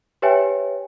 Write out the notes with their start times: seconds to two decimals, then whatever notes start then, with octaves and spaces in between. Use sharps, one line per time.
0.22 G4 B4 C#5 E5 G5 G#5